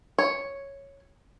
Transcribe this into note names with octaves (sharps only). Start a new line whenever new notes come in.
C#5